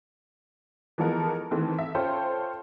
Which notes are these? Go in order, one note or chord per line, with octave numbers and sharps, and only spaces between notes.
E3 F3 G#3 B3 A4 A#4
D#3 E3 A3 C4
E5
C#4 F4 A4 C5 C#5 G5